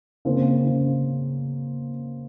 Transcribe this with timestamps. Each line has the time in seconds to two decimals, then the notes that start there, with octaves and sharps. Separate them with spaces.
0.25 C#3 A#3 C4
0.64 C#3